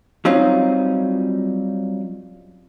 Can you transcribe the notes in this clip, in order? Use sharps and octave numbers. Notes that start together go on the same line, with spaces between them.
F#3 G3 C4 C#4 D#4 F4